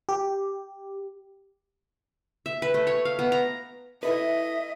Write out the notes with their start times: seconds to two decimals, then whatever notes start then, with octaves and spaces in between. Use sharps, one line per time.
0.09 G4
2.46 E5
2.62 B4
2.74 A3
2.87 C#5
3.05 F5
3.19 B3
3.32 A#5
4.03 E4 A4 B4 D#5 E5